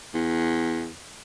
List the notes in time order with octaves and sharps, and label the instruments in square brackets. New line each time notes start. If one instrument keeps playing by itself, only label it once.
[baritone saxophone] E2